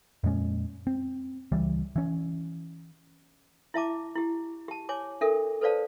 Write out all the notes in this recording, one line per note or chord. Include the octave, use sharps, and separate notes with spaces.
F2 A#2 G#3 C#4
C4
C#2 E3 G3
E3 C#4
E4 E5 A5 D6
E4 G4
G4 A5
C#5 G#5 D6
D4 A4 A#4 E5
A4 B4 C5 D5 F5 A5